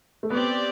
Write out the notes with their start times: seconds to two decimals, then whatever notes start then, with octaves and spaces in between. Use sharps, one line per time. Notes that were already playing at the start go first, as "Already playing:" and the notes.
0.23 A3
0.30 B3 C4 G4 D5